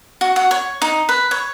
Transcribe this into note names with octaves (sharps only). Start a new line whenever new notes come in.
F#4
F#4
C#5
D#4
B4
C#5